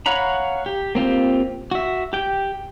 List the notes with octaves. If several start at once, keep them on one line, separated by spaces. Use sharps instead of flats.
C#5 F5 F#5 A#5 B5
G4
A#3 C4 F4 G4
F#4 E5
G4 G5